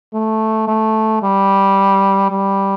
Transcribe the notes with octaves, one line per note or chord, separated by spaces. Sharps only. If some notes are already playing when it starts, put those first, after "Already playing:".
A3
A3
G3
G3